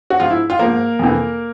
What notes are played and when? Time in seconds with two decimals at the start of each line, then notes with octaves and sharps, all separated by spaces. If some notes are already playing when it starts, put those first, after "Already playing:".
0.10 F#4
0.20 G#2 F3 F4
0.30 E4
0.50 F4
0.59 G#2 F3 A#3 A#4
0.99 F2 C3 E3